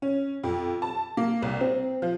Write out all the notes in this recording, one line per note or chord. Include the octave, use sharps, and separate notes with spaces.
C#4
F2
A5
A#3
C2
C4
F3